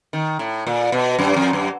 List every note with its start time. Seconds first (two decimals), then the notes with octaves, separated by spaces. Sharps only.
0.13 D#3
0.39 A2
0.67 A#2
0.92 B2
1.19 F#2
1.36 F2
1.53 F#2